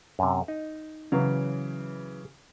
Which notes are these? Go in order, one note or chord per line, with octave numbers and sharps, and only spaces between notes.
F#2 C3
D#4
C#3 E3 F#3 F5